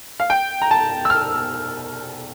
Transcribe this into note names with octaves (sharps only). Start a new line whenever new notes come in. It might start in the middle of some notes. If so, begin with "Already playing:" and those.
F5
G5
A#5
A5
E6
F6